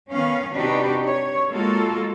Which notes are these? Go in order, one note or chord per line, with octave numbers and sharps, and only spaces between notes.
D#3 B3 C#4 F5
C3 D4 D#4 F#4 G4 B4
C#5
G#3 A#3 F4 F#4 A4